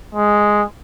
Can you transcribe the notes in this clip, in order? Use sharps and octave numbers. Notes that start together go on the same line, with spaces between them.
G#3